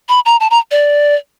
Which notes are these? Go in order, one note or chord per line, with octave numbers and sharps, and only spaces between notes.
B5
A#5
A5
A#5
D5